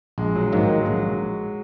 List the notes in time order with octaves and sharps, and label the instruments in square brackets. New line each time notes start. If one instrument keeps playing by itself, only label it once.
[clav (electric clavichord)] A#1 [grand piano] G#3
[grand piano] F#3
[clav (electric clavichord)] G#2 D#3 A#3 [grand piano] F#3
[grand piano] G#3
[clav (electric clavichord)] A#1 [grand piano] F#3